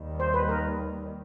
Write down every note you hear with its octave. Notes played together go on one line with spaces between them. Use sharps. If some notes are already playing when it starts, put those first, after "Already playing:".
Already playing: D#2 D#3 G3
C5
B4
A#4